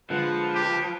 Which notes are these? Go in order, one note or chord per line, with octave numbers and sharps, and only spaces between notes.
D3 F3 G#3 B4 F#5
G4